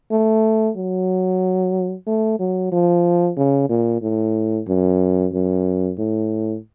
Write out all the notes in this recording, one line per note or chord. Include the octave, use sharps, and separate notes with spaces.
A3
F#3
A3
F#3
F3
C#3
A#2
A2
F#2
F#2
A2